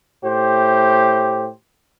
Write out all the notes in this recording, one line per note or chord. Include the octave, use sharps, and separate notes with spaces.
A2 G4 C5